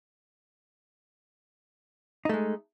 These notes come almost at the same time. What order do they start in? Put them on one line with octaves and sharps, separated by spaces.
D#4 A3 G#3